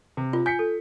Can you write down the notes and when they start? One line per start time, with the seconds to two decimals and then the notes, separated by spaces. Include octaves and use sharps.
0.17 C3
0.33 F4
0.46 G#5 G6 B6 C#7
0.59 A4